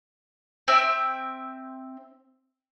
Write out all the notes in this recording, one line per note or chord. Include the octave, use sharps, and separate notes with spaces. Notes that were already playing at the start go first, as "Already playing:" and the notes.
C4 E5 G5